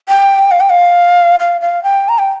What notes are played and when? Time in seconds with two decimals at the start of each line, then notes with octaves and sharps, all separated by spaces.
0.08 G5
0.51 F5
0.60 G5
0.70 F5
1.40 F5
1.61 F5
1.83 G5
2.09 A#5
2.19 G5